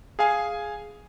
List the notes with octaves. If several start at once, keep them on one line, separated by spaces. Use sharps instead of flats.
G#4 F5 G#5